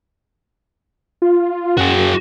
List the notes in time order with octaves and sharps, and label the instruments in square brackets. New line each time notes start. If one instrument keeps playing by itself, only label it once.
[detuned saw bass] F4
[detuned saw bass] F#2 [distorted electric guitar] F#4 G#4